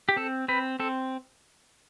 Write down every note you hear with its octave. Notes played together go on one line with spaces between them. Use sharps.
G4
C4 A4
C4 B4
C4 A4